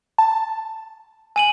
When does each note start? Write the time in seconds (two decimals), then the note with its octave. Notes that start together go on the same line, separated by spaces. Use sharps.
0.18 A5
1.36 G#5 D#7 F#7